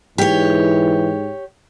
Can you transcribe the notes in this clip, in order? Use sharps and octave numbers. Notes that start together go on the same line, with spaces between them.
G#2 E3 G4 C#5